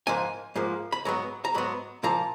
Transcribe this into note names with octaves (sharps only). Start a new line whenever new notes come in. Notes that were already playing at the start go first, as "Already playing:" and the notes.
G#2 F3 A#3 G#5
G#2 F3 A#3
B5
G#2 F#3 B3 A#5
A#5
G#2 F#3 B3 B5
A#2 F3 A#3 A#5